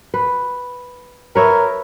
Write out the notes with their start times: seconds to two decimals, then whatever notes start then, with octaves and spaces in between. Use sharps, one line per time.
0.14 B4
1.35 A#4 B4 C#5 E5